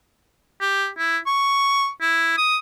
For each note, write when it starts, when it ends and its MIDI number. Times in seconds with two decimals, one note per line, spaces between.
0.61 0.88 67
0.98 1.18 64
1.27 1.89 85
2.01 2.34 64
2.37 2.57 87